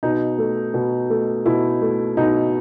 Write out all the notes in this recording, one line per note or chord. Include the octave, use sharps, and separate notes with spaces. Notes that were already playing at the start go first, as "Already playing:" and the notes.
B2 D#4
A3
B2
A3
B2 E4
A3
B2 D#4